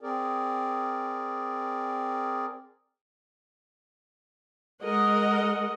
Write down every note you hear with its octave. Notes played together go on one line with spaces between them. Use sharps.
C4 G#4 A#4 D5
G#3 A#4 D#5 F#5